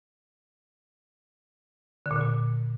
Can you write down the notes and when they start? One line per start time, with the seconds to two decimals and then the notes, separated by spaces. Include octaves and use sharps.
2.06 D3
2.11 A#2
2.16 D3
2.21 A#2